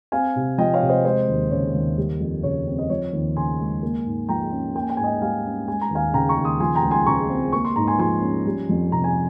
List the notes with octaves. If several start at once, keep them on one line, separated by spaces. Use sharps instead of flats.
C4 F5 G#5
C3
F3 D#5 G5
C#5 F5
C3
C5 D#5
G#3 C5 D#5
D#2
C#3 C#5
D#2
G3
F2
C#3 C#5
C4
D#5
F3 C#5
D#2
C#3 G#5 C6
G#3
A#3
G#2
F3 G5 A#5
C#4
A#3 G5
G#5
G5
G#2 G#5
D#5 G5
G3 F5 G#5
C#4
G#3 G#5
A#5
D#2 F5 G#5
C#3 G5 A#5
A#5 C#6
D#2
C6 D#6
F3 G#5 C6
G5 A#5
C#2
G#5 C6
C#3 A#5 C#6
C4
A#3 C#6
C6
G#2 A#5
G#5 C6
F3 G#5 C6
C#4
G3
F2
C3 A#5
G#5